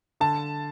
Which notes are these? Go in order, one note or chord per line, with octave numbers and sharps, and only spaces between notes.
D3 A5